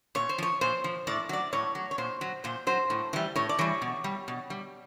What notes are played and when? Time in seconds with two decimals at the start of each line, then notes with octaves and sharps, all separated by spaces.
0.15 A#2 C#5
0.29 C5
0.38 F3 C#5
0.61 A#2 C5
0.84 F3
1.07 A2 D5
1.29 F#3 D5
1.53 A2 C#5
1.75 F#3
1.91 C#5
1.98 A#2 C5
2.21 F#3
2.44 A#2 C5
2.67 F#3 C5
2.90 A2
3.13 E3 G3
3.36 A2 C#5
3.49 D5
3.59 E3 G3 C#5
3.82 B2
4.04 G3
4.28 B2
4.50 G3